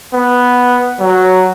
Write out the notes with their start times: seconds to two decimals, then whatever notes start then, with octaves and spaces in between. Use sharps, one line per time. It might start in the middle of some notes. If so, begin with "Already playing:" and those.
0.13 B3
1.00 F#3